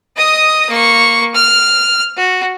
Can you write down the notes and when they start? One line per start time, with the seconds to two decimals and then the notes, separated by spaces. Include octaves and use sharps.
0.17 D#5 D#6
0.70 A#3 C#6
1.35 F6
2.17 F#4